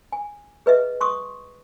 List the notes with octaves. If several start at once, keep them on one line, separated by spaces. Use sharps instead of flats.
G#5
G#4 B4 D#5 E5
C6 C#6 D#6